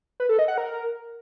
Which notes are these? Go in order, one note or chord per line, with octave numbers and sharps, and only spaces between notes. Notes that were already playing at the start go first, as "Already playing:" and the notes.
B4
A4
D#5
F#5
A#4